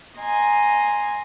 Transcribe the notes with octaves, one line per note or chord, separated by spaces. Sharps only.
D#5 G#5 A#5 C6